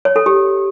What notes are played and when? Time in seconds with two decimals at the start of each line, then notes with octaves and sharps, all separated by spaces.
0.05 C#5
0.16 A4
0.26 G4